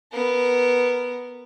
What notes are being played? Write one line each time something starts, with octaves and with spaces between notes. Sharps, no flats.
B3 A#4